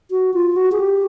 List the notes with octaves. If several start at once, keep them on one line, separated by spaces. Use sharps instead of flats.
F#4
F4
F#4
G#4
G4